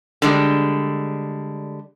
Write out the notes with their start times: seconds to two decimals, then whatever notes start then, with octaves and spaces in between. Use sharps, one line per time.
0.22 D3 G3 G#3